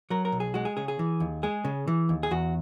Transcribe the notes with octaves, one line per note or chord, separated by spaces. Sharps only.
F#3 A#4
A#4
B1
G#4
G#3 F#4
G#4
C#3 G#4
G#4
E3
D#2
G#3 G#4
C#3
E3
D#2
G#4
E2 F#4